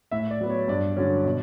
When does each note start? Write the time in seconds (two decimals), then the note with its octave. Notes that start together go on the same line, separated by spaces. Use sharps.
0.11 A2 E5
0.31 D5
0.41 F#3 B3
0.50 C#5
0.68 G2 D5
0.97 D3 F#3 C#4
1.25 B2